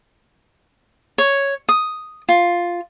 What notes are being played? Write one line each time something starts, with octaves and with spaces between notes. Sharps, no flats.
C#5
D#6
F4